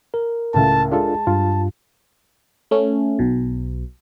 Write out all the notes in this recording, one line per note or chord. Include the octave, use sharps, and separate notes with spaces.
A#4
C#2 A2 A5
G#3 D4 F4 A4 A5
G2 F4
A3 C#4
B1 B2